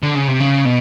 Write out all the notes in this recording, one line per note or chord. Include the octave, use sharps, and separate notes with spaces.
D3
C#3
C3
C#3
B2